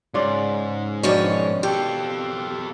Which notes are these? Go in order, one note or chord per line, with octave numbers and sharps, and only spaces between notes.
G#2 C#3 F4 D5
B2 D#3 F3 C#4 D4 C#5
F4 G4 A4